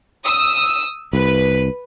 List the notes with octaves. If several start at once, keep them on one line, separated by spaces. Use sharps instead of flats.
D#6 E6
C2 B4